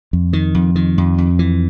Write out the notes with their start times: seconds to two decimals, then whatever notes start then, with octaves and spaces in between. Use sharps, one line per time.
0.13 F2
0.33 D#3
0.55 F2
0.75 D#3
0.98 F2
1.18 F2
1.39 E3